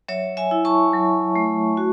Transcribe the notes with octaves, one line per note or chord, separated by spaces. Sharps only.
F#3 C#5 E5
E5 G#5
E4
A5 C#6
F#3
A3
F#4